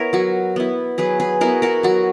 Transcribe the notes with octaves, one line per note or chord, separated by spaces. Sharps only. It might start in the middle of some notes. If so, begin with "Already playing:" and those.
Already playing: B3 E4 A#4 C#5 E5
F#3 F#4
B3 E4
F#3 G#4 B4
G#4 B4
B3 E4 F#4 A#4
F#4 A#4
F#3 F#4